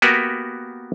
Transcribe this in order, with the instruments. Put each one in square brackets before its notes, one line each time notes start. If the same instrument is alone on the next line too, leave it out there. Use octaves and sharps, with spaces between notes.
[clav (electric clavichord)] A#3 B3 F#4 G4 A#4 B4